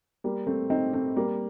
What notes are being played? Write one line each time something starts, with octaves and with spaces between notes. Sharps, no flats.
G3 A#3
A3 C4
C4 D#4
A3 C4
G3 A#3